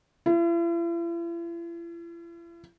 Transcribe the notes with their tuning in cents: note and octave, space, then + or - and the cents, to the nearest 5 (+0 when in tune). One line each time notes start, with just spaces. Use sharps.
E4 +45